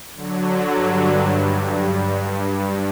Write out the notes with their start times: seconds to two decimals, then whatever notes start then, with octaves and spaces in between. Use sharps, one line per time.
0.15 D3 F#3
0.66 G2
1.15 G2